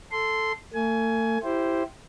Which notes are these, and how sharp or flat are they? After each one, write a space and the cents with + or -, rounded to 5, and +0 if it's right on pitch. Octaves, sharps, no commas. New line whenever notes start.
A4 +0 C6 -10
A3 +45 G#5 +15
E4 +10 G4 -10 C5 +0